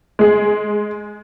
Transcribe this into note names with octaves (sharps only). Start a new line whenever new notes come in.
G#3 G#4